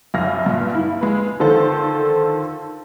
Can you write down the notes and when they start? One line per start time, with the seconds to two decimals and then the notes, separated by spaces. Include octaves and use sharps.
0.14 C2 F#2 F4 F6 A#6
0.46 G2 A#2
0.75 E4
1.01 G#3 B4
1.40 D3 D#3 F3 F4 A4 C5